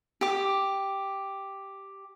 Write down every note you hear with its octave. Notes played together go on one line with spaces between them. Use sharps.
G4 D6